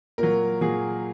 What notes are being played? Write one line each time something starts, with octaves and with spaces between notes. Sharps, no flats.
A#2 F#3 A#4
A#2 F#3 G#4